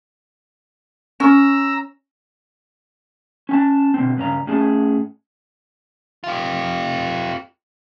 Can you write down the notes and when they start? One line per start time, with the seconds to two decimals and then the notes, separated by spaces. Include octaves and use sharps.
1.20 C#4 A#5 E6
3.49 C#4 G#5 A5
3.94 B2 D3 C4
4.17 G2 C#3 C#4 A#5
4.47 A2 C#4 G#4 A5
6.24 F4 G4